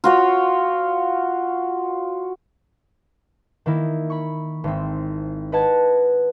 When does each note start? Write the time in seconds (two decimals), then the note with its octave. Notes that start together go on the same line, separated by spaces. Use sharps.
0.04 F4 F#4 C#5
3.66 D#3 A#3 E4
4.10 B5 C#6
4.64 G#1 C4
5.52 B4 D#5 F#5 A5 G#6